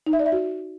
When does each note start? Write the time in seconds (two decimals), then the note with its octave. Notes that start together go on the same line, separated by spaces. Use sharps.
0.07 D#4
0.13 E5
0.19 D5
0.26 E5
0.32 F#4